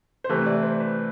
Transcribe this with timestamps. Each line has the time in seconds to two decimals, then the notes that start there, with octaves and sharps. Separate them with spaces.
0.24 C5
0.29 C3 E3 A3 B4
0.46 D5
0.62 C5
0.80 B4